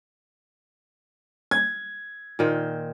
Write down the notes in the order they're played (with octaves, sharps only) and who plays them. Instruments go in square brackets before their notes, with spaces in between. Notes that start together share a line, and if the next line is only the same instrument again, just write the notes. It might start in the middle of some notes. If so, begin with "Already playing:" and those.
[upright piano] G#6
[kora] A#2 D#3 C5